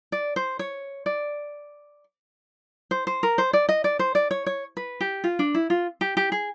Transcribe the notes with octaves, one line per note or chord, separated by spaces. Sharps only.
D5
C5
C#5
D5
C5
C5
A#4
C5
D5
D#5
D5
C5
D5
C#5
C#5
B4
G4
F4
D4
E4
F4
G4
G4
G#4